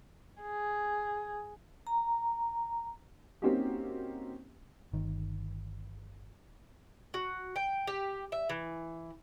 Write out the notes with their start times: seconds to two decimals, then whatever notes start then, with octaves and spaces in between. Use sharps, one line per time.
0.42 G#4
1.87 A#5
3.42 A#3 C4 C#4 D#4 F#4 G4
4.93 G1 D#3
7.14 F#4
7.56 G5
7.87 G4
8.32 E5
8.50 E3